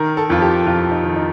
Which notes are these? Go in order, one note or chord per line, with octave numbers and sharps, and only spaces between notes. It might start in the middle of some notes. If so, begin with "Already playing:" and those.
Already playing: D#3 A#4
A4
F2 F4
G4
F2 F4
D#4
D#3
D#4